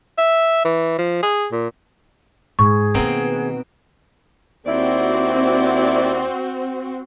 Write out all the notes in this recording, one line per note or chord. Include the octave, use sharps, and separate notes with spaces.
E5
E3
F3
G#4
A#2
G#2 G#4 C#6
B2 D#3 A#3 C4 D#4
D#2 C4 E4 F#4 D5